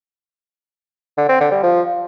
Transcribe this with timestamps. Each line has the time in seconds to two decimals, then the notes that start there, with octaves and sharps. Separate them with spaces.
1.18 D3
1.29 C4
1.40 D3
1.52 G3
1.63 F3